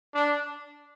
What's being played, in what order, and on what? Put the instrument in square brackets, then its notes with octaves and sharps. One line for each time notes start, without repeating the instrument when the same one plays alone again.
[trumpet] D4